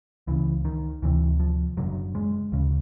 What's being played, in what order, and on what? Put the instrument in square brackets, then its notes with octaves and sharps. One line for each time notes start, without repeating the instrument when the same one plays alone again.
[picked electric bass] C#2 C#3 E3
D#3
D2 C3 E3
F3
F#1 F#2 D3 F#3
G#3
D2 C#3